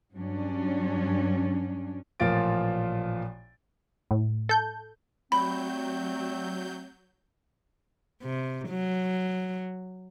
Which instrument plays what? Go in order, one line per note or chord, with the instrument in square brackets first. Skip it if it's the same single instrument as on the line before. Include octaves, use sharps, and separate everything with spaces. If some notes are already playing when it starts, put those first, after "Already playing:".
[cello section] G2 F#3 C#4 D4
[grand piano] A1 A#2 F3 F4 A6 D7
[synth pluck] A2
A4 G6
[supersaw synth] F#3 G6 [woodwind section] G3 A3 C4 [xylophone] B5
[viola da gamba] C3
F#3